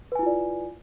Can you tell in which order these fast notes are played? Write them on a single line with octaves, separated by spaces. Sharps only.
B4 G#5 E4 F4 D5